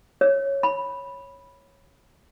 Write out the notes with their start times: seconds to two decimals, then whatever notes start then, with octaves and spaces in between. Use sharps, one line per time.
0.21 C#5
0.63 B5